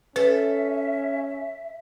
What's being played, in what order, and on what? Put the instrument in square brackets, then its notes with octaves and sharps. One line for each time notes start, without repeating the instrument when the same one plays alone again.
[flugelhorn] C#4 [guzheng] A4 [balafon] B4 [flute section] E5